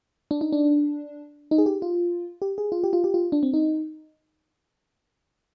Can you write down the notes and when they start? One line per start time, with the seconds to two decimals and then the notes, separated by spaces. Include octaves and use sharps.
0.31 D4
0.41 D#4
0.53 D4
1.51 D#4
1.58 G#4
1.66 G4
1.82 F4
2.42 G4
2.58 G#4
2.72 F4
2.84 G4
2.93 F4
3.04 G4
3.14 F4
3.32 D4
3.43 C4
3.54 D#4